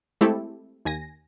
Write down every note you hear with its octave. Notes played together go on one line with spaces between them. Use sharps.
G#3 A3 C4 E4 G4 A4
D#2 G#5 A#6